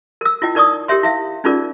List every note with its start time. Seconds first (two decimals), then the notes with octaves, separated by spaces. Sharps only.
0.21 A#4 E6
0.42 E4 F4 D#5 G5
0.55 D#4 A#4 D5 C#6 D#6
0.88 G4 A#4 C#5 E5 C6
1.03 E4 E5 F5
1.44 C#4 D#4 F4 G#4 A#4 D5